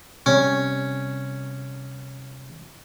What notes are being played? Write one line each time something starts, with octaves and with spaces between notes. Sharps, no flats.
C3 G3 C4 C#4